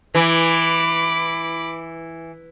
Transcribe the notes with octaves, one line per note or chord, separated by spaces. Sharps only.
E3 B5 D6